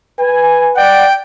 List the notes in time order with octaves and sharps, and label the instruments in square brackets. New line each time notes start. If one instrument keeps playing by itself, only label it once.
[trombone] B4 [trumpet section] G#5
[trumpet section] D5 F#5 [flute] G5